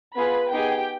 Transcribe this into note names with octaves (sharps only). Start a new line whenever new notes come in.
B3 F4 G#4 B4 B5
B3 D#4 G4 G#4 G5